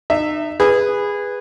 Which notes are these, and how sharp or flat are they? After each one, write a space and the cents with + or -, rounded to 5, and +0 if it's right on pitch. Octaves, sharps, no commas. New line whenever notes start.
D#4 -35 E5 +0
G#4 -15 B4 +0